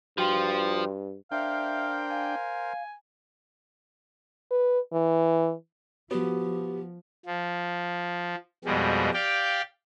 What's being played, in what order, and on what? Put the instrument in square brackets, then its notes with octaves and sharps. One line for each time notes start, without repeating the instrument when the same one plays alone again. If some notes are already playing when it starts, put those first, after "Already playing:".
[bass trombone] G2 [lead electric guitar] F3 [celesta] F#4 G5 C6
[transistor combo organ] D4 G5 [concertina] A#4 C5 [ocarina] E5 [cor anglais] F5
[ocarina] F5 [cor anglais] G#5
[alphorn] B4
E3
[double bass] F3 [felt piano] B3 [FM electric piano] F#4 [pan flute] G4
[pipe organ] F3
F2 B2 G3 G#3
G4 D5 F5 G5